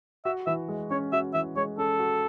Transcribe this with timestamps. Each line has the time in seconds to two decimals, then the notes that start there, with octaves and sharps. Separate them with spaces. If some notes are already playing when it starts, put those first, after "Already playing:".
0.25 F#4 E5
0.46 E3 E5
0.68 G#3
0.91 C#4 C#5
1.12 F#4 E5
1.34 E3 E5
1.56 G#3 C#5
1.78 C#4 A4
1.99 F#4